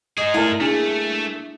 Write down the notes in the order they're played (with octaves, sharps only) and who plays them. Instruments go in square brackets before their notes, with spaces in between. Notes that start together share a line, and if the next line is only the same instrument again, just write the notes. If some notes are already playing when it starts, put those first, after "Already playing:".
[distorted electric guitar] D#4 G#4 [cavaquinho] D#5
[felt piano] A3 A#4 [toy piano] E4 D5 [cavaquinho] G#5
[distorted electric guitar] A3 [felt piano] A#3 G#4 [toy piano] D4